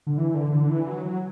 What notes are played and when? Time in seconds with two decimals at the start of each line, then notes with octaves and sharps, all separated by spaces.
0.07 D3
0.18 E3
0.34 D3
0.52 D3
0.69 E3
0.87 F#3
1.05 F#3